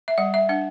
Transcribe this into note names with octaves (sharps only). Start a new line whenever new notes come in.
E5
G3 F#5
E5
D4 F#5